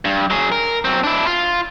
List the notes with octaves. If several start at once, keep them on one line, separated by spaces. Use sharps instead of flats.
G2
F#3 G#4
A#4
F#3 C4
D4 E4
F4